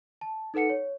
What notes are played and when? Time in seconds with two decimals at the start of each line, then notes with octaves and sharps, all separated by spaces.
0.21 A5
0.54 D#4 A4 B4 F#5 C#7
0.70 C#5